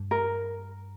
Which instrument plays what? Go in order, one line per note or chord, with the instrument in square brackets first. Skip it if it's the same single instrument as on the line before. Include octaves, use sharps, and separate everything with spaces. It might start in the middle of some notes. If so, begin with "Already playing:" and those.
Already playing: [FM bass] G2
[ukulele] A#4